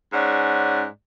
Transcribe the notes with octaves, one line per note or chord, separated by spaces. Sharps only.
G#2 C#4 D5 F#5